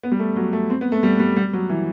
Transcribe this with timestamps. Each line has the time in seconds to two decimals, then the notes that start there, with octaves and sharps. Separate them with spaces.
0.03 B3
0.12 G3
0.19 A3
0.36 F#3
0.53 A3
0.70 C4
0.81 B3
0.92 A3
1.03 G3
1.20 G3
1.37 G3
1.53 F#3
1.69 E3